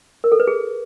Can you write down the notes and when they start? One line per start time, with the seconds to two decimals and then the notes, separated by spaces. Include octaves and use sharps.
0.24 A#4
0.32 A4
0.40 B4
0.47 G#4